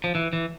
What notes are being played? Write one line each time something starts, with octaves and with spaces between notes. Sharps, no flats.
F3
E3
E3